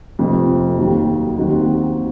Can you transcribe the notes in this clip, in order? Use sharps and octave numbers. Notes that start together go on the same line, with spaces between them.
F1 F2 C3 F3
D#2 D#3 F#3
D#2 D#3 F#3 C4 F#4